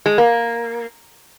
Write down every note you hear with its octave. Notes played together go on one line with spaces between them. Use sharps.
G#3
A#3